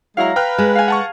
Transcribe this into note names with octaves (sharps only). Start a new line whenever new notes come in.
F#3 G#3 E4 F5 A#5
B4 G5 F6
G#3
F5 G#5
F#5 A5 C#6